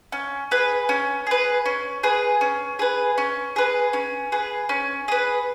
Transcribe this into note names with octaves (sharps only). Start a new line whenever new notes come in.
C#4
G#4 B4
C#4
G#4 B4
C#4
G#4 B4
C#4
G#4 B4
C#4
G#4 B4
C#4
G#4 B4
C#4
G#4 B4